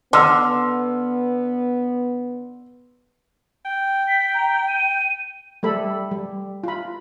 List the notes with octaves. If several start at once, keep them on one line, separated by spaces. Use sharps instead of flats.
D3 B3 C6 E6 F6
G5
B6
A#5
D#7
G3 A3 A4 B5
G3
F4 B5